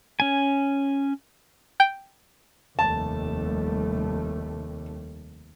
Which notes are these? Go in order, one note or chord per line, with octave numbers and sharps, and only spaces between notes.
C#4 G#5
G5
F1 D#2 G3 A3 A5